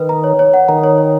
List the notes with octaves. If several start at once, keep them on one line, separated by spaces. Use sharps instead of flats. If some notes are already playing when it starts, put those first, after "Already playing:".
Already playing: D#3 B4
A#5
C#5
C#5
F#5
D#3 A#5
C#5
C#5